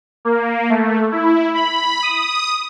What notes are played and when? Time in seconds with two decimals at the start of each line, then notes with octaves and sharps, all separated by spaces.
0.25 A#3
0.70 A3
1.12 E4
1.54 B5
2.03 D#6